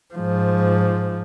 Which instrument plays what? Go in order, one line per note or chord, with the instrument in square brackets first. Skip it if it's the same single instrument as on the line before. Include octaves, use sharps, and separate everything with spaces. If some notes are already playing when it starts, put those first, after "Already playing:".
[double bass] G#2 F3